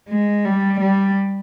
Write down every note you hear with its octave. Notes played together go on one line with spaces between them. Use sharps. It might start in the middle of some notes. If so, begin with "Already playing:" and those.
G#3
G3
G3